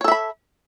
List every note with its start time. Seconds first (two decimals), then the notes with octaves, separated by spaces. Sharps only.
0.01 C#5
0.04 A4
0.08 E5
0.11 B5